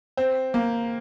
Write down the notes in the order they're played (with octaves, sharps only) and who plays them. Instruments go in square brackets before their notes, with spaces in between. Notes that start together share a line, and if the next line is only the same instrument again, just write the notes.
[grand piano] C4
A#3